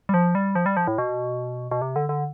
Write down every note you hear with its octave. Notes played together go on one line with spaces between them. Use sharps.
G3
F3
G3
F3
G3
F3
A2
B2
B2
C3
D3
D3